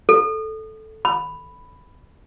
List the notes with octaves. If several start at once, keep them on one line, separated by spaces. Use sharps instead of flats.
A4
B5